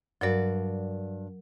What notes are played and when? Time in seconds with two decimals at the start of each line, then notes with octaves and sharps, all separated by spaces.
0.21 G2 F#3 F#4 A#4 D5